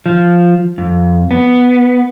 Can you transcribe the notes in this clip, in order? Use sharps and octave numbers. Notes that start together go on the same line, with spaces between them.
F3
F2
B3